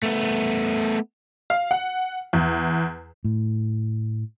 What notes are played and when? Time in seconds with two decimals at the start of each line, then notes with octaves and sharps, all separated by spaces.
0.02 A3 B3
1.50 F5
1.71 F#5
2.33 E2
3.24 A2